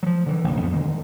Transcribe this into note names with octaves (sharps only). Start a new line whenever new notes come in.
F3 F#3
D3 E3
F1 A#1
F2 B3
D3 D#3 G#3